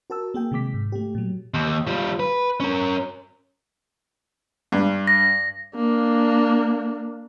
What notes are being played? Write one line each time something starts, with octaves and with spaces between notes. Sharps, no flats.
F#4 A#4 A5 E6
A#3 G#4 G5
C3 D#3 G#3 D6 B6
G#2
A3 G4
A#2 F#3
D#2
G3 F4
B4
C#4 A#4
G2
A#6
A#3 D4